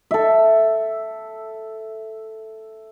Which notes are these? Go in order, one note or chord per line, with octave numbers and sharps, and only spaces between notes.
A4 E5